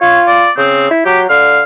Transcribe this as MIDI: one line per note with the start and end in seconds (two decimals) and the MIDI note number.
0.01 0.47 65
0.01 0.20 73
0.27 0.51 74
0.57 0.86 49
0.57 0.87 60
0.91 1.03 64
1.06 1.27 54
1.06 1.20 67
1.29 1.63 50
1.29 1.63 77